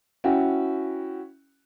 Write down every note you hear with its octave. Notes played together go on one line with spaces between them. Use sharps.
C#4 E4 F#4 G5